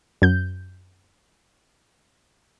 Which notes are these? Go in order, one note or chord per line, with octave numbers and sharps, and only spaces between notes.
F#2 G6